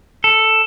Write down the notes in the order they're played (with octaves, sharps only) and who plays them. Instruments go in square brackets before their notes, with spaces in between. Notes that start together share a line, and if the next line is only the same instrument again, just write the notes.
[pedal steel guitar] A4